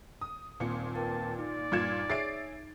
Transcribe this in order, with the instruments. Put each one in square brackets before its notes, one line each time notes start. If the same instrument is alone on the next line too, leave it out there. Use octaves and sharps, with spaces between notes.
[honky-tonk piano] D#6
[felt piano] D#1 C4 C#7 [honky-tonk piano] A#2
[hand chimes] A#4 B4 G5 [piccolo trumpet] A5
[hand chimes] D#4 [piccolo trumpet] D5
[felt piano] G2 C#7 E7 [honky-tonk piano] A#2 F4 G#6
[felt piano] G#4 C#5 E5 [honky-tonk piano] A6 C7 D7